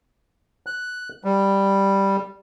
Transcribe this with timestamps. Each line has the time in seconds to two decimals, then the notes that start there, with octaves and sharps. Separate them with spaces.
0.66 F#6
1.24 G3